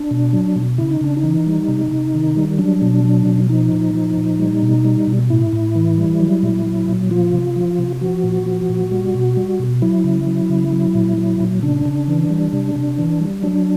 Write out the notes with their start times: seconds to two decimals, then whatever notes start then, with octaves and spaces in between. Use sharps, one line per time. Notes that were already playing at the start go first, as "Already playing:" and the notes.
Already playing: D4
0.11 B2
0.33 F#3
0.56 B2
0.78 C#3 E4
0.91 D#4
1.01 C#3 D4
1.17 D#4
1.24 E3
1.47 G3
1.68 C3
1.91 C3
2.14 D#3
2.36 G3
2.59 F#3 D4
2.82 B2
3.04 F#3
3.27 B2
3.49 F3 D#4
3.72 A#2
3.94 F3
4.17 A#2
4.40 G3
4.62 B2
4.85 G3
5.07 B2
5.30 A2 E4
5.53 A2
5.75 E3
5.98 G3
6.20 F#3
6.43 A#2
6.66 F#3
6.88 A#2
7.11 F3 F4
7.33 C3
7.56 F3
7.79 C3
8.01 F3 F#4
8.24 A#2
8.46 F3
8.69 A#2
8.92 G3
9.14 B2
9.37 G3
9.59 B2
9.82 F#3 E4
10.04 C#3
10.27 F#3
10.49 C#3
10.72 F#3
10.95 A#2
11.17 F#3
11.40 A#2
11.63 C#3 D4
11.85 C#3
12.08 E3
12.30 G3
12.53 C3
12.75 C3
12.98 E3
13.20 G3
13.43 F#3 D4